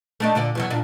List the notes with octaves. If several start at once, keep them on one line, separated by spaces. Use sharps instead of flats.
A3 D4 D#4
A#2 D3 D5
E2 B2 F#3
A#2 D4